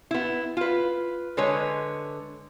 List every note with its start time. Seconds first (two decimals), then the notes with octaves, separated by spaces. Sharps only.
0.11 B3 E4
0.57 F4 B4
1.37 D3 G#3 B4 C#5